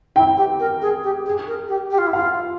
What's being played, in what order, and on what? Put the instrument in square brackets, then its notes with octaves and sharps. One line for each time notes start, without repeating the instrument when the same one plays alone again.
[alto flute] E4 [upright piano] G5
[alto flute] G4
A#4
G#4
G4
G#4
A#4
G4
G4
F4
E4
[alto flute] F4 [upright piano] F5